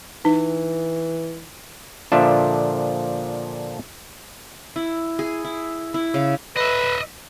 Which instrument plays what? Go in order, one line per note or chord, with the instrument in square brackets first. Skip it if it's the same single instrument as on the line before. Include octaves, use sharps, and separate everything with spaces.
[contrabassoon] E3 [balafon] D#4
[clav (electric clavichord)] A#2 D3 F3 D4 E5 A5
[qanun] E4
G#4
E4
E4
C#3
[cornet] B4 [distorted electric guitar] D#5 E5